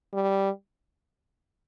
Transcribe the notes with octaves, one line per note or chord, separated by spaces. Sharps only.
G3